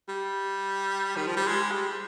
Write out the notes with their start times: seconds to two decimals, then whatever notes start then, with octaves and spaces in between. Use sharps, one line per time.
0.09 G3
1.16 D#3
1.27 F3
1.37 G3
1.48 G#3
1.71 G3